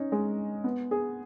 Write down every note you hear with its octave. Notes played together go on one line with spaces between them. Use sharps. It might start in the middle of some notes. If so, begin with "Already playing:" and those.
Already playing: C#4 D#4
G#3
B3
G#4